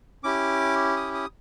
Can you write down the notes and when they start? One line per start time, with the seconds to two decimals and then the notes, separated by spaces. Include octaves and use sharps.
0.24 C#4 E4 G4 D6
0.97 D#6
1.15 D#6